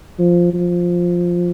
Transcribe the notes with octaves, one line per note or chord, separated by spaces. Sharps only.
F3
F3